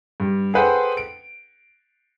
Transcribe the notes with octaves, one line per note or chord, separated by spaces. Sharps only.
G2
G#4 A4 B4 C5 F#5 G5
D7